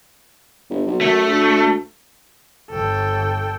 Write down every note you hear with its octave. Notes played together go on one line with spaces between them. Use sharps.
G1
B1
F#2 A3
D2
G1 A4 G5